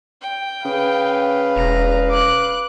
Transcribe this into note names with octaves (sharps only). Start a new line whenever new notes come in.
G5
C#3 B4 F5
E1 A#5
D6 F#6